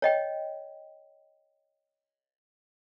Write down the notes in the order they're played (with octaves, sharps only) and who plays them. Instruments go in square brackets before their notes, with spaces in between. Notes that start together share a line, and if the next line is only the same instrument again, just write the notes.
[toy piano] C#5 D#5 G5